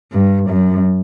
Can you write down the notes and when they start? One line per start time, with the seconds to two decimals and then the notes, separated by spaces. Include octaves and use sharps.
0.12 G2
0.49 F#2